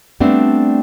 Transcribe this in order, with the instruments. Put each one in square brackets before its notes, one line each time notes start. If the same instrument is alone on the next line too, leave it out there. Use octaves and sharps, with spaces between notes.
[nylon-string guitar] G3 A3 B3 C4 D4